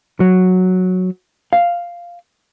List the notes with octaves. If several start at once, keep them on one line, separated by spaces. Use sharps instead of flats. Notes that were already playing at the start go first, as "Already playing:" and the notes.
F#3
F5